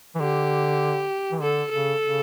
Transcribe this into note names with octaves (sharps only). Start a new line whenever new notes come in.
E3
D3 G4
E3
D3 A4
C#3 A4
C#3